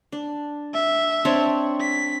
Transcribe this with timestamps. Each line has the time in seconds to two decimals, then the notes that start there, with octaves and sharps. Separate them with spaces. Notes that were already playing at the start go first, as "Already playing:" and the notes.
0.12 D4
0.74 E5
1.25 C4 D4 C#5
1.80 B6